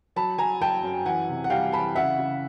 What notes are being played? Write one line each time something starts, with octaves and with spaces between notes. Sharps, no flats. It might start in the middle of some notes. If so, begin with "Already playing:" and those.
F#3 A5 B5
F#3 G#5 A#5
F#3 G5 A5
F#2
E3 F#5 G#5
C3
F#5
G3 F5 G5
E3 A5 B5
C#3 E5 F#5
C#3